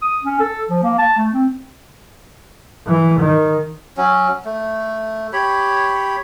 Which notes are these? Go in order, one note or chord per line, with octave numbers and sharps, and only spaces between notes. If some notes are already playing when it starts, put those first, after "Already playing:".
D#6
C#4
A4
F3
A#3
A5
A3
C4
E3
D#3
F#3 C#4
A3
G4 C#5 B5